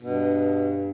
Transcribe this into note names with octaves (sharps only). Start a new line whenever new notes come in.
G2 B2